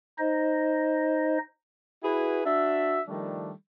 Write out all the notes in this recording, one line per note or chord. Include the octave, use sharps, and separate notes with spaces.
D#4 C5 D#5
E4 F#4 G#4 B4
D4 F#4 E5
D#3 F3 G3 A3 D4